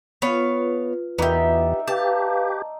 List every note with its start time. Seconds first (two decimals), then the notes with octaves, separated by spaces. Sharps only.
0.22 B3 F4 B4 C#5 F5
1.18 E2 B3 D#4 G4 D5 E5
1.87 G4 B4 F5 A5